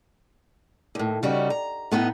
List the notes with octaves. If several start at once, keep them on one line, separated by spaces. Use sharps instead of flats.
D#2 A2
C#3 G3 D#4 F#4
A#5
A2 B3 D#4